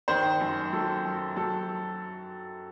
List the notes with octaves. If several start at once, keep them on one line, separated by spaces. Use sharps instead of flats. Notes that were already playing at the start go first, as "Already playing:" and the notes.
D#3 C5
F#2
F#3 A4
F#2
F#3 A4